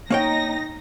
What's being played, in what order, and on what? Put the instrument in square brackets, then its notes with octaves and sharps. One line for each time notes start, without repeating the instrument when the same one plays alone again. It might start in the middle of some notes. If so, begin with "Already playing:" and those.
[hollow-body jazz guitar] A#3 C#5 G5 [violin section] D#4 A#6